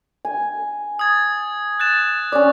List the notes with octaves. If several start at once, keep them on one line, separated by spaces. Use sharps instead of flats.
G#5
D#6 G#6 A6
F#6 A6 E7
C#4 D5 D6